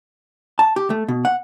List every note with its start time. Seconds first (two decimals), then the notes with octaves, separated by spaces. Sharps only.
0.59 A5
0.76 G4
0.90 A3
1.08 B2
1.25 F#5